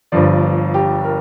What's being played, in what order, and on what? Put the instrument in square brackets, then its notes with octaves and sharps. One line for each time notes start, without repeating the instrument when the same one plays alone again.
[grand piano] G1 G2 F3 D5
G4
A#4